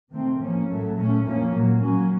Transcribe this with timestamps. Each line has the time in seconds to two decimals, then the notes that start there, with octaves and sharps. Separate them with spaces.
0.11 C3 D#3 A3 C4
0.38 A2 F3 A#3 C#4
0.67 A2 F#3 A3
0.96 A#2 A3 C#4
1.24 A#2 F3 A#3 C#4
1.52 A#2 F#3 A#3
1.80 A#2 F#3 A#3 C#4